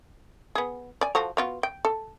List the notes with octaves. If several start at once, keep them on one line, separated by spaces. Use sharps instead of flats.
B3 G#4
D5 G#5
F3 F#4 A4
B3 F4 F#4
G5
A4